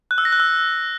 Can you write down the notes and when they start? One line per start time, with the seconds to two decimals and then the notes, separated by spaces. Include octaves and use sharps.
0.11 F#6
0.18 E6
0.25 A#6
0.32 F#6
0.40 E6